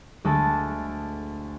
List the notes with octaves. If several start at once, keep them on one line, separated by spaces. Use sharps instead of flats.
D2 G#3 A4 A5